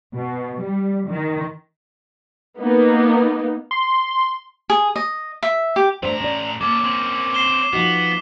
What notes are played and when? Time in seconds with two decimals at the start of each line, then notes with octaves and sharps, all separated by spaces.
0.15 B2
0.62 G3
1.10 D#3
2.59 A#3 B3 D#4
3.71 C6
4.70 G#4
4.96 D#5
5.43 E5
5.76 G4
6.03 A2 A3 D4 C5 A#5
6.21 C#4 D5
6.61 A#3 C#4 A4 D6
6.83 C4 C#4
7.34 C7 E7 G7
7.73 F3 B3 D#4 F#4